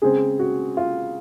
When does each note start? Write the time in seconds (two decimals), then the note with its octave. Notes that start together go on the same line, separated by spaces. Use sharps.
0.02 C#3 G#3 C4 G#4
0.39 F#4
0.77 F4